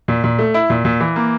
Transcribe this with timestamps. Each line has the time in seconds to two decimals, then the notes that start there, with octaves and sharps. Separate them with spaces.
0.08 A#2
0.24 A#2
0.39 A3
0.54 E4
0.70 A#2
0.85 A#2
1.00 E3
1.16 A#3